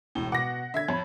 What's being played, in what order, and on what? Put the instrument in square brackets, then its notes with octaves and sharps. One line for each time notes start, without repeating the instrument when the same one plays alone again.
[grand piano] E1 G7 [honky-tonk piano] A2
[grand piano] B2 D6 [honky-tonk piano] F#5 A#6
[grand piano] D3 B6 [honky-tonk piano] E5 G#6
[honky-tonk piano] F2 [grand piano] C#5 B5